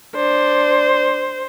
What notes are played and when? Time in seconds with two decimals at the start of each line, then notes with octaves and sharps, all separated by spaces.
0.16 D4 C5